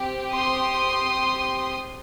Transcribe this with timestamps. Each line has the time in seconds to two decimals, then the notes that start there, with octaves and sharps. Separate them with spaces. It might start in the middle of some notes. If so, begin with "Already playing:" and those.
Already playing: C4 G4
0.32 C6 D#6